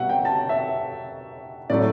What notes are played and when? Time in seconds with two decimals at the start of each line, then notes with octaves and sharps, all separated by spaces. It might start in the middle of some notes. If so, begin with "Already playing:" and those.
Already playing: B2 G3 E5 F#5
0.09 G5
0.25 A5
0.49 E5
1.70 A2 F#3 A3 D5